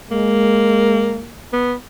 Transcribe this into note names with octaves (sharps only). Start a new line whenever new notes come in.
G#3 A#3
B3